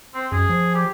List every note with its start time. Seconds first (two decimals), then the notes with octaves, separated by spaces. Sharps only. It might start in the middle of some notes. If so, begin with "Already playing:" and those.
0.14 C4
0.32 F#2 G#4
0.49 F3
0.75 G4